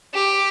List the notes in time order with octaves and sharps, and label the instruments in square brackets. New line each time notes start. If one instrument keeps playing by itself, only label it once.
[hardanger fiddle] G4